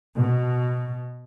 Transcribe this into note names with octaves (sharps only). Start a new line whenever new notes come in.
B2